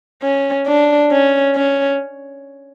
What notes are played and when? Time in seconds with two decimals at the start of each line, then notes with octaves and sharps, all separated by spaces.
0.23 C#4
0.67 D4
1.11 C#4
1.55 C#4